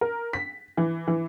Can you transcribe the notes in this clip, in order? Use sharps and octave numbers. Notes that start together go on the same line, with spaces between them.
A#4
B6
E3
E3